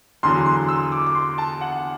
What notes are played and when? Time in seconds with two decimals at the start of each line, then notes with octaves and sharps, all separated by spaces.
0.23 E2 D3 F#3 C6
0.46 C6
0.68 E6
0.92 D6
1.06 D6
1.15 C6
1.38 A5
1.61 F#5